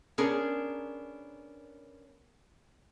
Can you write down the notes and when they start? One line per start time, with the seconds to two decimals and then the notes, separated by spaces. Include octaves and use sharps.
0.18 B3 C#4 D4 G#4 A#4